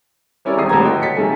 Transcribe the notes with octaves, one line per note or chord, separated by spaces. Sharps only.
G3 C#4 E4 A#4 C#5 D5
G#1 E2 G4 D#6 C7
D#2 A2 D3 B4 A#5 G#6
F#4 A4 D#5 G5
A6 B6 C#7
D#2 D#3 G#4 A4 E5 G#5